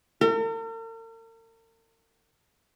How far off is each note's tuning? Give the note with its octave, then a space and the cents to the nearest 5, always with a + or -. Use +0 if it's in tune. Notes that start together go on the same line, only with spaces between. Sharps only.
A#4 -45